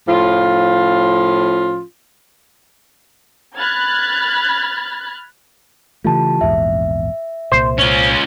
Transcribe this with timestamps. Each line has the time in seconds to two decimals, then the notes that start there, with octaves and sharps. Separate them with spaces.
0.08 A2 F3 C#4 F4
3.56 B5 F6 F#6 G#6 A6
6.04 C#3 E3 A3 F4 G4 A5
6.41 A#1 E2 G#2 E5
7.52 C2 A#2 C5
7.79 C#4 F4